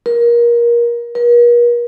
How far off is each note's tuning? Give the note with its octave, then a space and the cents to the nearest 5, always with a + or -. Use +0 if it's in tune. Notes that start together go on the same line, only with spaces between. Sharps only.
A#4 +25
A#4 +45